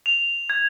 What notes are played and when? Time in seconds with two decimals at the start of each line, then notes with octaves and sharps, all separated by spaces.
0.06 F7
0.50 G#6